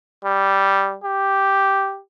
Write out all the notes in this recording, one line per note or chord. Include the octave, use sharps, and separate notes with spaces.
G3
G4